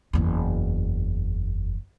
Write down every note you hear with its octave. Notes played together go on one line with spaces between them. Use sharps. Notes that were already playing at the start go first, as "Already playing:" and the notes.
F#1 E2